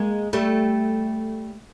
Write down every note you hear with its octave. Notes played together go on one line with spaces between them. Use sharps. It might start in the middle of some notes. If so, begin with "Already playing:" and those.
Already playing: G#3 A#3
G3 A3